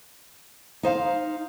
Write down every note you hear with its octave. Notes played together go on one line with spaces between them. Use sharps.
D#4 C5 F5